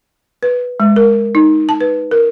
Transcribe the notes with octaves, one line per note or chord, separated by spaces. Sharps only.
B4
G#3
A#4
D#4
A5
B4
A#4